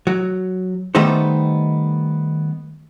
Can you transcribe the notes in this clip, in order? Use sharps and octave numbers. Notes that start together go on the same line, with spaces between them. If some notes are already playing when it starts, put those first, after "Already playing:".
F#3
D#3 G3 A3 B3 D#4 C5